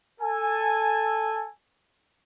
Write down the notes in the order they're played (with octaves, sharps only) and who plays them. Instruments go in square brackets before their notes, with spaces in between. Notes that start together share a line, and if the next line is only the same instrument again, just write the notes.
[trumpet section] A4 G#5